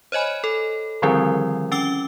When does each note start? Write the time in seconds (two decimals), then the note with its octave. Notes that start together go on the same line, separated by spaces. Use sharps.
0.12 C5 C#5 D#5 G#5 B5
0.44 A4
1.02 D3 D#3 F3 G3 C4 E4
1.72 C#4 G5 D6 E6 G7